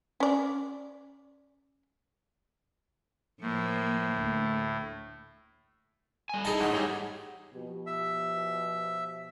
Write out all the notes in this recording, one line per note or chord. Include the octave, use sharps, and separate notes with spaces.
C#4 D5
A2 F3 A#3
D2
G3 G#5
D#4 E4 G#4 D#5 A5
A1 G#2 F#5
G3 A3 D#4 G4 G#4 C#5
B2 F3 G4
E5